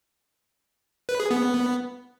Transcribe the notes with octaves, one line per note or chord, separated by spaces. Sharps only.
B4
G#4
B3